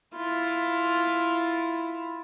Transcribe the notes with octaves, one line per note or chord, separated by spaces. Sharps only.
E4 F4